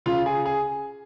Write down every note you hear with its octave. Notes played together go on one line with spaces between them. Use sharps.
C#3 F4
G#4
G#4